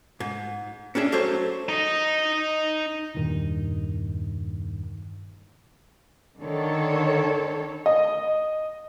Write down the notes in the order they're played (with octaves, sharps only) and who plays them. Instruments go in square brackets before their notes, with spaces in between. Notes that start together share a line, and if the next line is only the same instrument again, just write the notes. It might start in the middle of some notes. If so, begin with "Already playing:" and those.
[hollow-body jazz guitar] G#2
C#4 D4 G#4 E5
F#3 A4 C5 C#5
[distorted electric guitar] D#4 D#5
[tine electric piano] E2 G2 A#2 D#3
[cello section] D3 D#3 D4 A4 C#5
[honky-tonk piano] D#5